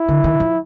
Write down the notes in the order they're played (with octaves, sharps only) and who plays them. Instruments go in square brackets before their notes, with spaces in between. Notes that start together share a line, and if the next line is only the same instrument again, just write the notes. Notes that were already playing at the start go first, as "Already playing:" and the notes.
Already playing: [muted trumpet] E4
[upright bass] D3
D#3
F3